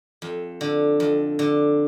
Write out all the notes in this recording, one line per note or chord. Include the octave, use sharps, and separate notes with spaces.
F2
D3
F2
D3